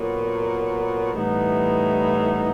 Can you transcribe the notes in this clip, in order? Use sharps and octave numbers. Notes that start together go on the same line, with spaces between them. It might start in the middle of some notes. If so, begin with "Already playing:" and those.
Already playing: A#2 F#3 B3
A2 E3 G3 B3 D#4